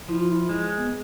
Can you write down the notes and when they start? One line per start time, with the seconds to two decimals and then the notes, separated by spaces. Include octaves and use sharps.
0.09 F3 E4
0.20 F4
0.31 E4
0.49 G#3
0.78 B3